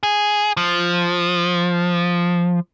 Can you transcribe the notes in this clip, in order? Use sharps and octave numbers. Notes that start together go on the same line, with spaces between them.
G#4
F3